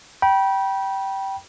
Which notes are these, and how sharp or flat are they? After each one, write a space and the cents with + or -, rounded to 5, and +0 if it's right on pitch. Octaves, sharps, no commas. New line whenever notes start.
G5 -15 B5 -30